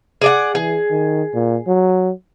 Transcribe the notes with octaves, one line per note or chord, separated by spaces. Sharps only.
G#4 D5 F#5
E3 G#4
D#3
A#2
F#3